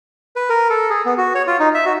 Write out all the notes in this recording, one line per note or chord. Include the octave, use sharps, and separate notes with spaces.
B4
A#4
A4
G#4
B3
F#4
C#5
F4
D#4
E5
F#4